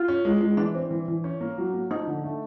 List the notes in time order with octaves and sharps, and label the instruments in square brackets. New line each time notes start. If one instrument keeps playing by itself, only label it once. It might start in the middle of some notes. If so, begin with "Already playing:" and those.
Already playing: [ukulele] F4
[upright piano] C#4
G#3
G#3
[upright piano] E3 [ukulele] D4
[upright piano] C4
E3
E3
C#4
A#3
F#3
A#3
[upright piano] F3 [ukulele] D#4
[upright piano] D3
A3